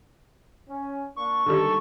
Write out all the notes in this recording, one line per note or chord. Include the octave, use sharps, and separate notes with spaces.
C#4
A#3 D4 C#6
D3 D#3 G3 G#3 A#3 A4